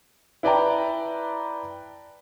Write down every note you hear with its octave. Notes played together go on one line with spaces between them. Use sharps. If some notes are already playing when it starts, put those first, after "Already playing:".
E4 B4 D5 G5 A5 A#5